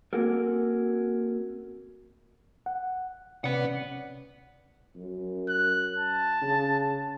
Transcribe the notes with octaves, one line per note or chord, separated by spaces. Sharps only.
A#3 C4 C#4 F#4 A4 A#4
F#5
C3 C#4 B4 D5 F#5
F#2
F#6
A5
C#3